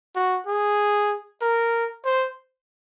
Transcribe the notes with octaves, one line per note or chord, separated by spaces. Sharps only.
F#4
G#4
A#4
C5